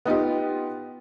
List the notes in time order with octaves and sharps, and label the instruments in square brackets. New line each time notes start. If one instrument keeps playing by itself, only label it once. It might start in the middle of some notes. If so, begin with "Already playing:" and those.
[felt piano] B3 D#4 F4 G4